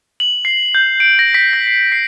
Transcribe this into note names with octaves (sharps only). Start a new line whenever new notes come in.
F#7
C7
G6
D7
A#6
B6
A#6
C7
C7